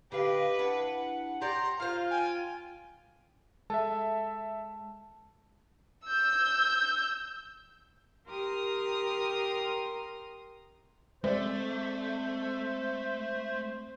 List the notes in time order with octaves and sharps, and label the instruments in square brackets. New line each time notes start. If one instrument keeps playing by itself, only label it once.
[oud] D3 F5 [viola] G4 D#5 [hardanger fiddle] B4
[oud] D4 E4 [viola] F#5
[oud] G4 D5 [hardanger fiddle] A#5 [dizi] C6
[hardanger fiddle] F4 [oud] C5 F5 [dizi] F6
[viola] G5 [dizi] G#5
[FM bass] G#3 [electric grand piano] A4 E5 [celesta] A5
[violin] E6 G6
[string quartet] G4 A#4 C6 D#6 F6
[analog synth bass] G#3 [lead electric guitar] A3 [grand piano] C4 D5 [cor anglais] C5